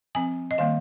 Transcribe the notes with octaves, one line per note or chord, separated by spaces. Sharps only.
F3 C4 G#5
D#5
D#3 G3 A#3 F5